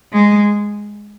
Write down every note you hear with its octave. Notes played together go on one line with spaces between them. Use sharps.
G#3